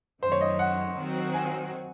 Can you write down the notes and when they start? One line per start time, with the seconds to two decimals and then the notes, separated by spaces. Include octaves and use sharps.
0.22 F#2 D#3 A3 C5
0.32 C#5
0.41 D#5
0.59 F#5
0.97 D#3 F#3 C4 F#4
1.33 G#5